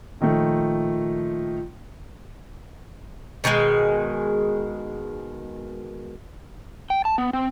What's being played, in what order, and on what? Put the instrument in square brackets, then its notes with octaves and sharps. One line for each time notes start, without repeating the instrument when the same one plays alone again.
[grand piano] A#2 D#3 F3 A3
[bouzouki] B2 D#3 F3 G#3
[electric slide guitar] G5
A5
B3
C4